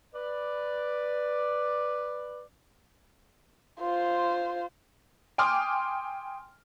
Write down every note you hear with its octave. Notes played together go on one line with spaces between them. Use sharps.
B4 D5
F4 C5
G5 G#5 C6 D6 D#6 F6